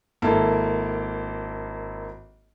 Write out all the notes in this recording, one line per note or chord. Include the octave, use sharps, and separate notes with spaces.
G#1 A#3 E4 A4 F5